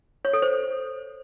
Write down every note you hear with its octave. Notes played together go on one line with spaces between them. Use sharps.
C#5
A4
C5